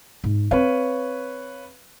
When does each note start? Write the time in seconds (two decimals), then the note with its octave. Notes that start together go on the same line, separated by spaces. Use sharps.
0.24 G#2
0.51 C4 B4 C#5 F5